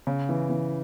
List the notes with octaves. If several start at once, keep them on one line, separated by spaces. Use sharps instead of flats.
C#3
E3
E3